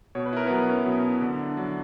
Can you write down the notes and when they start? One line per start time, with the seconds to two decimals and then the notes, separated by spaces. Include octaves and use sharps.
0.15 B2 C#5
0.26 B4
0.33 E4 A#4
0.47 F#3 B3 B4
0.68 C#4
0.85 B2
1.04 E4
1.21 D3
1.39 D4
1.57 F#3